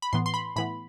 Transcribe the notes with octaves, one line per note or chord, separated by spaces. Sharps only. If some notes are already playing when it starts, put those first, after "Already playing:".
B5
A2 E3 B3 C6
C6
B5
A2 E3 B3 B5